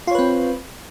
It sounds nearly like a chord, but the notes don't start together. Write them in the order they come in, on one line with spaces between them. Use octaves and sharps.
F4 C#5 B4 C4